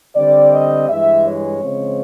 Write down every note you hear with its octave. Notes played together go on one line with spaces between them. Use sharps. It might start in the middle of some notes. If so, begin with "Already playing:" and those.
D3 G3 C4 D5
D#5
G2 E3 G#3 E5
C#5
C#3 F3 G#3 C4